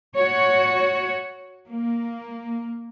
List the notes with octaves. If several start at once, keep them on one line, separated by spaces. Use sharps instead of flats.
F#4 C#5
A#3